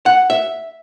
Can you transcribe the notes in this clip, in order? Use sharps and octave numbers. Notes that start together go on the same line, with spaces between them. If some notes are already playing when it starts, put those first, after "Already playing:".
F#5
E5